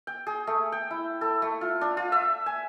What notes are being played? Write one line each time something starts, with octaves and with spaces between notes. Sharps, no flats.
G5
G#4
A3
G5
E4
A4
A3
F4
D4
F4
E5
G#5